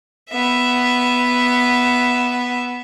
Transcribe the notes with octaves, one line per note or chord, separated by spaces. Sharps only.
B3 E5